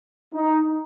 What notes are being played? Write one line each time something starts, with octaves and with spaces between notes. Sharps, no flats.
D#4